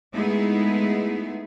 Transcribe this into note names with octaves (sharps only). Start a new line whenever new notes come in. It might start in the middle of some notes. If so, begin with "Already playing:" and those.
G#3 A3 B3 D#4 E4 G#4